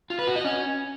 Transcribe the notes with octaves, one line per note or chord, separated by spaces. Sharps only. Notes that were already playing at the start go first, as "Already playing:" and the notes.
F4
B4
F#4
D#5
C#4